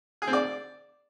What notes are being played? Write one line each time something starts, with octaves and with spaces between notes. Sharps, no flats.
G#4
C4
D5